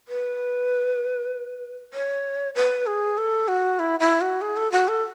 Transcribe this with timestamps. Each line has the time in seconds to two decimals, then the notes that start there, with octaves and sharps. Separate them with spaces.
0.08 B4
1.94 C#5
2.55 B4
2.87 G#4
3.18 A4
3.48 F#4
3.79 E4
4.00 E4
4.21 F#4
4.42 G#4
4.57 A4
4.72 F#4
4.88 A4